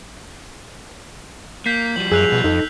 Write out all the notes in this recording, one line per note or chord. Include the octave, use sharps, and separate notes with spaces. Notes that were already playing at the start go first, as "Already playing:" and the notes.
A#3 G6 B6 C7
F3 G3 F#7
F#2 G#4 E6 F#6 F7
B2
F2 D#4 A4